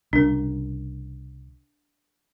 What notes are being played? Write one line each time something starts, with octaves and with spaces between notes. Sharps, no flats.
C2 C#3 D4 A#4